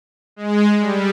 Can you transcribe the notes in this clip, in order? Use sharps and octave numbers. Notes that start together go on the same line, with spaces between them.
G#3
G3